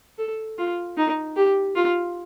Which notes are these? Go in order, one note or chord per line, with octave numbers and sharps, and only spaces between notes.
A4
F4
D#4
G4
F4